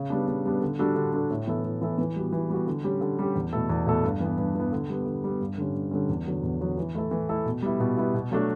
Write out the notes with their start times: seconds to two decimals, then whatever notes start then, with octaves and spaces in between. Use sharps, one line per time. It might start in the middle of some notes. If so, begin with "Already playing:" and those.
Already playing: C#3
0.10 G3 B3 D4
0.28 C#3
0.45 G3 B3 D4
0.62 D3
0.79 G3 D4 F#4 A4
0.96 D3
1.13 G3 D4 F#4 A4
1.31 A2
1.47 E3 B3 E4 A4
1.64 A2
1.81 E3 B3 E4 A4
1.98 E3
2.16 G3 B3 F#4
2.33 E3
2.50 G3 B3 F#4
2.67 D3
2.84 G3 C#4 G4
3.01 D3
3.19 G3 C#4 G4
3.36 E2
3.53 B2 A3 E4 A4
3.70 E2
3.86 B2 A3 E4 A4
4.03 G2
4.20 E3 B3
4.38 G2
4.55 E3 B3
4.72 D3
4.90 G3 B3
5.06 D3
5.24 G3 B3
5.40 G2
5.58 D3 G3 C#4
5.75 G2
5.91 D3 G3 C#4
6.09 E2
6.26 D3 F#3 B3
6.43 E2
6.60 D3 F#3 B3
6.78 E3
6.95 A3 E4 A4
7.11 E3
7.29 A3 E4 A4
7.46 B2
7.62 G3 B3 E4
7.80 B2
7.97 G3 B3 E4
8.14 B2
8.31 F#3 A3 D4 F#4